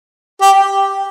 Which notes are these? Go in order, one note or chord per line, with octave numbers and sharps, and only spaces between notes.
G4